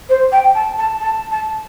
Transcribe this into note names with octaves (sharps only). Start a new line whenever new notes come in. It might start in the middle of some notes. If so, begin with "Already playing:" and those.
C5
G5
A5
A5
A5
A5